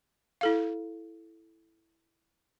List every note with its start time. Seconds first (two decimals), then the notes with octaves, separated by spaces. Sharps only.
0.41 E4 A4 F5